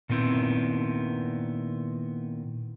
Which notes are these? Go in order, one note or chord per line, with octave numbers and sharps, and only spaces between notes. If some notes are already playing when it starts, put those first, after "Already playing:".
A#2 D#3 B3 C4 E4